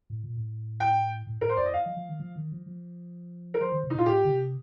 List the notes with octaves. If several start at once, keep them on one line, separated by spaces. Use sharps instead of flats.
A2
A#2
A2
G5
A2
A2 A#4
C5
F2 D5
D#5
F5
F3
F3
D#3
F3
D#3
F3
F3
A#4
F3 C5
D#3
C3
D#4
A#2 F4
A2 G4
D3
C3